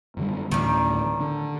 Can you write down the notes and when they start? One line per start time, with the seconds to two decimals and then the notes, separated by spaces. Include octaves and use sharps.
0.17 F#2 D3 G3
0.51 D2 A2 D#3 E3 G3
1.20 D3 D4